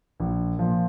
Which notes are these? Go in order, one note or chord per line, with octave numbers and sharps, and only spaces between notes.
A#1
A#2 F3